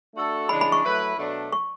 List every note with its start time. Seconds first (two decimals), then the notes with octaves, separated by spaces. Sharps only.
0.14 A3 D4 F#4 A4
0.49 C#3 E3 G#3 D4 B5
0.61 B5
0.72 C#6
0.83 F#3 A3 E4 B4
1.18 B2 F#3 A3 D4
1.52 C#6